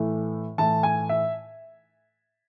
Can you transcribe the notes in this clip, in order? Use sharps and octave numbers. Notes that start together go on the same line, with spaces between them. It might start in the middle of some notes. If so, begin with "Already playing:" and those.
Already playing: A2 E3 A3
A2 E3 A3 A5
G#5
E5